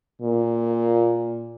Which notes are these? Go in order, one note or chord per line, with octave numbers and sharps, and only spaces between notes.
A#2